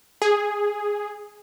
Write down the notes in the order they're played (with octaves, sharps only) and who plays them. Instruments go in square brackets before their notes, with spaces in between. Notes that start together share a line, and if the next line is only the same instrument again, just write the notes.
[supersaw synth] G#4